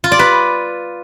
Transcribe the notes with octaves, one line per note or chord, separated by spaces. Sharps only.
F4
D5
B4